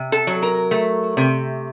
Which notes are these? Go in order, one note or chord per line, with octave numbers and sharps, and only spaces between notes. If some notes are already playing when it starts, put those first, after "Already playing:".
Already playing: C3
A4
F#3
A#4
A3
C3